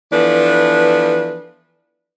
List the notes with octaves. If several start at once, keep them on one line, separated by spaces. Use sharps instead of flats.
E3 F3 B3 D4 A4 B4